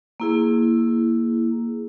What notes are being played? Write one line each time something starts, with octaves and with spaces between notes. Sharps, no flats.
A#3 E4 G#4